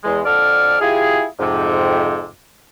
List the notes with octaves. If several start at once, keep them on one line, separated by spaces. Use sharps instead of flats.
E2 G#3
F2 D3 A4 D5 F6
E4 F4 G4 G#4
F2 G#2 C3